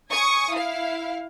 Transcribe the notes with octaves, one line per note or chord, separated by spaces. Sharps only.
G#5 C#6 D#6
E4 F5